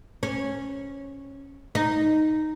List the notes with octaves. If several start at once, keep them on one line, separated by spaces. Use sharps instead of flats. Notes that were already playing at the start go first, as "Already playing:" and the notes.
C#4
D#4